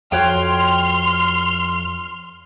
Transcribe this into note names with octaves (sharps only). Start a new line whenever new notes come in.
F2 F#4 C#5 G5 C6 F6